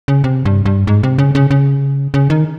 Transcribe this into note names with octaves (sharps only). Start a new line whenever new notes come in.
C#3
C3
G2
G2
G#2
C3
C#3
C#3
C#3
C#3
D#3